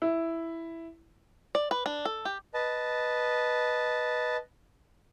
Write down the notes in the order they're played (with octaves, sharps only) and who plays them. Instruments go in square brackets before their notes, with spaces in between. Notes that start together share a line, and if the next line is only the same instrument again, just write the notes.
[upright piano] E4
[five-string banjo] D5
B4
D4
A4
G4
[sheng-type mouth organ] B4 D#5 A5